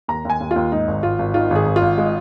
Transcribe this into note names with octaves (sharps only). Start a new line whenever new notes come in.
D#2 A#5
D#2 G#5
D#2
F4
D#2
G#2 D#4
G#1
G#1 F4
G#1
D#3 F4
G#1 G#4
G#1
F4
G#1
G#3